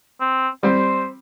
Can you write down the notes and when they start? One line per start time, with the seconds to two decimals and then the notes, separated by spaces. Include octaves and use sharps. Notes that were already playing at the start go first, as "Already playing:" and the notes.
0.20 C4
0.63 G3 C4 C5